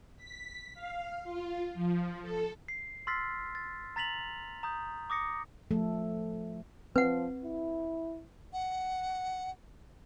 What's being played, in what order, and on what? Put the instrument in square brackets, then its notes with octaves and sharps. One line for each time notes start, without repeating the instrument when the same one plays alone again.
[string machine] B6
F5
F4
F3
A4
[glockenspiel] C7
C6 E6 F6 A6 B6 C7
A6
A#5 A6 B6 F7 F#7
A#5 D#6 G6
D6 D#6 A#6 C#7
[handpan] F3 A3 A4
[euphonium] F3 [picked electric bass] C4 [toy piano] B4 F#5
[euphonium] E4
[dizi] F#5